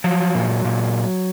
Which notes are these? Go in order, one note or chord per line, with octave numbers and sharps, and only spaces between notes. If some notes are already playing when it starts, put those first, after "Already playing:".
F3 F#3
A#2
A#2